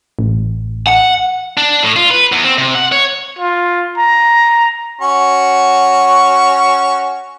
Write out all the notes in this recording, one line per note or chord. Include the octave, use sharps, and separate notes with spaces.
A1
F#5
D4
A2
F4
B4
E2
C4
C3
F#5
C#5
F4
A#5
C#4 F#4 C#6